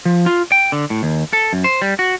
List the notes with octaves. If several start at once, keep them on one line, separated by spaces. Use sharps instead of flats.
F3
F4
G5
D3
A2
D#2
A4
F#2
C5
G3
F#4